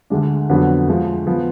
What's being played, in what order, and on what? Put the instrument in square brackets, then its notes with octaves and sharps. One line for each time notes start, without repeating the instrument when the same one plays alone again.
[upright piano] D2 D3 G#3 D4
F2 D3 F#3 B3 D4
D2 D3 F3 G#3
F3 B3